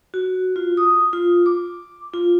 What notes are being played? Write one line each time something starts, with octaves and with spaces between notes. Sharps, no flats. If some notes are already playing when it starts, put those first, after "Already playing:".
F#4
F4
D#6
F4
D6
F4